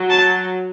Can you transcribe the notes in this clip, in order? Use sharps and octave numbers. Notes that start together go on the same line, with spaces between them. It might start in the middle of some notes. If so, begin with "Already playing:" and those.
Already playing: F#3
A5